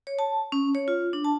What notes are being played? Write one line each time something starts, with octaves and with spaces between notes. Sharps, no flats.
C#5
A5
C#4
C#5
F4
D4
A5